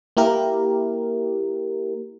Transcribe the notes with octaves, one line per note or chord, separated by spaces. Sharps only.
A#3 E4 G4 A#4